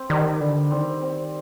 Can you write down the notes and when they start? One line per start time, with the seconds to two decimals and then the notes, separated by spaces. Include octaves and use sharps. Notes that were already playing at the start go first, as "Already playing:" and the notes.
Already playing: C4
0.09 D#3 G3
0.41 D3 G3
0.71 D#3 C4
1.02 C4